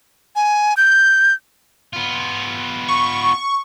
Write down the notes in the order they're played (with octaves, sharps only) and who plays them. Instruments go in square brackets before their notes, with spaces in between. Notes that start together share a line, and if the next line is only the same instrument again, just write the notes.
[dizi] G#5
G6
[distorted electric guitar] B3 F4
[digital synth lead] C#6